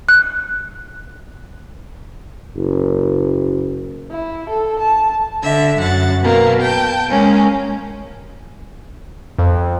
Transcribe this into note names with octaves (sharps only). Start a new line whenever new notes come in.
F#6
F#1
E4
A4
A5
D3 E5
F#2 F#5 A6
B2 A#3
G5 A5
G#3 A#3 C#4
F2